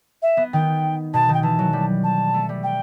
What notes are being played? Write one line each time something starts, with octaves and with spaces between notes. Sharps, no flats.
E5
B3
D#3 G5
B2 A5
D#3
G5
E3 A5
F#3
G3
A5
A3
G3
G5